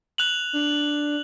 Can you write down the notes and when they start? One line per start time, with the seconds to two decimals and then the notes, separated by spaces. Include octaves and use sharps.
0.18 F#6 F7 F#7
0.53 D4